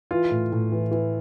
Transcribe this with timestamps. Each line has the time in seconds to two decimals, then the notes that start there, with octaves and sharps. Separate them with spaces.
0.11 E3 F4
0.31 A2
0.52 A2
0.72 E3
0.91 E3